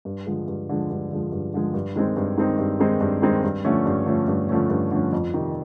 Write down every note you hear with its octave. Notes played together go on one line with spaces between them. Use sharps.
G2
D3 F3 G#3
G2
D3 F3 G#3
G2
D3 F3 G#3
G2
D3 F3 G#3
G2
D#3 G#3 C4 D#4
G2
D#3 G#3 C4 D#4
G2
D#3 G#3 C4 D#4
G2
D#3 G#3 C4 D#4
G2
D3 F3 A3 C#4
G2
D3 F3 A3 C#4
G2
D3 F3 A3 C#4
G2
D3 F3 A3 C#4
F2
C3 D#3